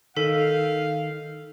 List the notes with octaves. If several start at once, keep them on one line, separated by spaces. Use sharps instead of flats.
D#3 A4 F5 B6